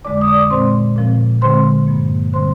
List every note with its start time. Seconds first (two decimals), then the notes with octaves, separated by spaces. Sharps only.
0.05 F2 D3 G#3 D5 D6
0.21 D#6
0.27 D5 D6
0.50 A#2 G#3 C4 C5 C6
0.96 A#2 F3 C4
1.41 D3 G#3 C4 C5 C6
1.87 G2 F3 A#3
2.33 D3 G3 C4 C5 C6